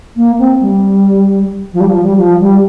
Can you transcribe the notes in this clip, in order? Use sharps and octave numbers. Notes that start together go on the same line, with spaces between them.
A#3
C4
G3
F3
G3
F3
G3
F3
G3